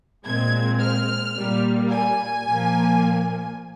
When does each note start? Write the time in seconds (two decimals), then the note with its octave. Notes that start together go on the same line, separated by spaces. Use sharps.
0.25 A#2 G#3 C4 G#6
0.80 F6
1.36 A#2 G3 A#3
1.91 G#5
2.46 A#2 F3 A#3